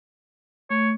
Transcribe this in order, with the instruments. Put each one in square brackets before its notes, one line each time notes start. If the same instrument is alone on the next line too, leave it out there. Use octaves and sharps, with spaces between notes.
[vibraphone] A3 [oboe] C#5